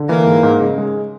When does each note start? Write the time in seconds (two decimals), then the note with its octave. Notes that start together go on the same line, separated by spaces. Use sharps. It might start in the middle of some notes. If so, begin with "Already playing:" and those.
Already playing: D3
0.09 E3 A#3
0.26 G#2
0.43 G#2
0.60 C#3
0.78 G#3